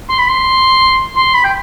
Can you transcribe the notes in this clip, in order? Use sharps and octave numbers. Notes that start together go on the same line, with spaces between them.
C6
B5
C6
C6
B5
G5